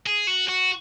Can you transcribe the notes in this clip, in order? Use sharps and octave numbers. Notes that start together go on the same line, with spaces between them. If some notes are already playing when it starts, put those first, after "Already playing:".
G#4
F#4
F#4